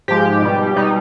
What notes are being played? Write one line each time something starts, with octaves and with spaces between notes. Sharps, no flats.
G#2 F3 G#3 G4
B2 G3
B2 G3 D#4